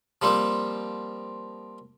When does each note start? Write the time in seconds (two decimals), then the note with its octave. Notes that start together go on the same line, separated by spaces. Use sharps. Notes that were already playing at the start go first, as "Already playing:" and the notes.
0.22 F3 G3 A#3 C4